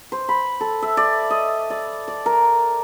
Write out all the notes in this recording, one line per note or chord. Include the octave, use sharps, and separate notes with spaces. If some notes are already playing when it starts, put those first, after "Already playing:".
C5
B5
A4
E5
D5
D#5
D5
D5
A#4